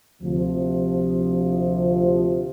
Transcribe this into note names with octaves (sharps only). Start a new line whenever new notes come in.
D2 C3 F3